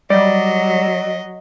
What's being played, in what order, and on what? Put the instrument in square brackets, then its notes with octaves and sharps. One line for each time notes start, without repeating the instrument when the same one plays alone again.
[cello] F#3 [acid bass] G3 [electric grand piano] D5 [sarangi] D#5